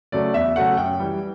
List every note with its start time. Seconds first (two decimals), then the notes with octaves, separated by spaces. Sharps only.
0.12 C#3 F#3 A3 D5
0.34 E2 E5
0.56 C#3 F#3 A3 F#5
0.77 F#2 G5
1.00 E3 G3